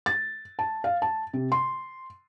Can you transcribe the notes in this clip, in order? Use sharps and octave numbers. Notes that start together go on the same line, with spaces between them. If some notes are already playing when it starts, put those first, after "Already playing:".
A6
A5
F5
A5
C3
C6